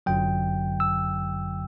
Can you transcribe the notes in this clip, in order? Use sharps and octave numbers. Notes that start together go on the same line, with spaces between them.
G1 F#2 D3 F#3 G5
E6